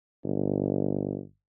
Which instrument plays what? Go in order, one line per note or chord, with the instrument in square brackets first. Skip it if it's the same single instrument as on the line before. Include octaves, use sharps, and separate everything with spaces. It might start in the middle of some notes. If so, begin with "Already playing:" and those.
[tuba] G1